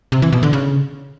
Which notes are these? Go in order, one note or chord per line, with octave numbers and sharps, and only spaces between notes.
C3
E3
B2
D3
C#3